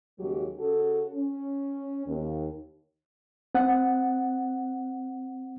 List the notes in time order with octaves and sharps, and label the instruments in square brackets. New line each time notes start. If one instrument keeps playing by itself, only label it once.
[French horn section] D#2 C#3 F#3 G#3 G4
C#3 F#4 A4
C#4
D#2
[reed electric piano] C4 F#5